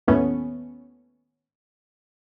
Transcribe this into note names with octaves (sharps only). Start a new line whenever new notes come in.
D#2 A2 A3 B3 C#4